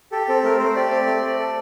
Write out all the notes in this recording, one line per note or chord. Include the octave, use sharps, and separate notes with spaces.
G4 A4
C4 A4
A3 A#4
A3 C5
G4 D5
C4
A3
A3
A4